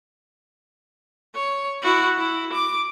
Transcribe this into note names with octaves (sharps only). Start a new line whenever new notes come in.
C#5
E4 F#4
E4
D6